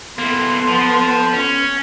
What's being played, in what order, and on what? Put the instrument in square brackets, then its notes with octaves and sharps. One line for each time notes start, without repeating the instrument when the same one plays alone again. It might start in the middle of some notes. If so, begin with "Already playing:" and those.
[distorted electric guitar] A#3 E4 [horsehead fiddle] B3 [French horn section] A4 [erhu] C6
[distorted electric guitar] F3
C#4